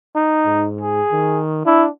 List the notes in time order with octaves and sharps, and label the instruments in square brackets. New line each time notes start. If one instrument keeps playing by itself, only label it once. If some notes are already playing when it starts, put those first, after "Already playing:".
[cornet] D#4
[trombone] G#2
[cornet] G#4
[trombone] D#3
[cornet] D4 [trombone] E4